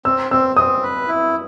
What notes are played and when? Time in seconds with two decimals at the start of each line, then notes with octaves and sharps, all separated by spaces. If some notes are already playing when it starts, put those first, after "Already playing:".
0.05 C4 E6
0.31 C4 E6
0.56 C4 D#6
0.83 B4
1.08 E4